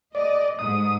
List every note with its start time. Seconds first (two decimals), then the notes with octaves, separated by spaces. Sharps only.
0.15 D5 D#5
0.59 G#2 D#6